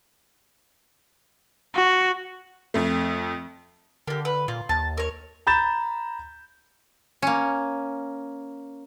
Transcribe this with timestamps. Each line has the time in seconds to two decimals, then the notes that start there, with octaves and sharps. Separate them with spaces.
1.75 F#4
2.74 F2 A3
4.07 D3 A#3 G4
4.25 B4
4.48 A#2 F4
4.69 D#2 A5
4.97 A#4 C#5
5.47 A#5 B5 G6 A6 E7
7.22 A#3 C#4